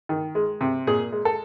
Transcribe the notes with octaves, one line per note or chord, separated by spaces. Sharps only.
D#3
G#3
C3
A#2 G#4
G#3
A4